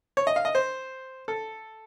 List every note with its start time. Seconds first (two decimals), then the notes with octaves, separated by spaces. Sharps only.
0.17 C#5
0.27 D#5
0.36 F5
0.45 D#5
0.55 C5
1.28 A4